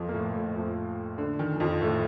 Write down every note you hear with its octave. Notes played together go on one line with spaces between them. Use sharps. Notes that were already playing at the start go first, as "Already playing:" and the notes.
Already playing: F2 F3
A#3
A2 A3
A2 A3
F2 F3
D3
D#3
D#3
F2 F3
A2 A3